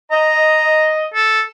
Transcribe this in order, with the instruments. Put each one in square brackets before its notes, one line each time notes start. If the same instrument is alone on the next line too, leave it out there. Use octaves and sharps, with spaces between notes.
[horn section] D#5 [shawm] A#5
[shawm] A4